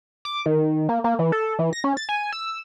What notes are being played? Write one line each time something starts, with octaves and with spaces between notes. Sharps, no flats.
D6
D#3
A#3
A#3
E3
A4
E3
A#6
C#4
A6
G#5
E6